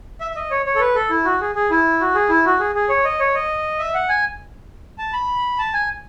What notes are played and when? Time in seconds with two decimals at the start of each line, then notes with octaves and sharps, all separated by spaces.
0.21 E5
0.31 E5
0.36 D#5
0.51 C#5
0.66 C#5
0.75 A4
0.80 B4
0.95 A4
1.10 E4
1.25 F#4
1.41 G#4
1.55 G#4
1.71 E4
2.01 F#4
2.15 G#4
2.29 E4
2.45 F#4
2.59 G#4
2.75 G#4
2.89 C#5
3.04 D#5
3.20 C#5
3.35 D#5
3.79 E5
3.94 F#5
4.09 G#5
4.98 A5
5.13 B5
5.59 A5
5.73 G#5